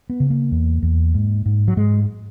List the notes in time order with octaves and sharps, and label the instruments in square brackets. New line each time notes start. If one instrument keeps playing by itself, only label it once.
[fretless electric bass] B3
C#3
A#3
E2
E2
G#2
G#2
F#3
G#2 G#3